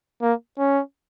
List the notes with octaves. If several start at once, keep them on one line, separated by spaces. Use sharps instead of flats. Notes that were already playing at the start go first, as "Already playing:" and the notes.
A#3
C#4